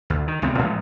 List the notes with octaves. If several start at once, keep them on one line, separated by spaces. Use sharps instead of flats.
D2
D#3
C#2 C3 B3 C4
A1 A2 F3 G#3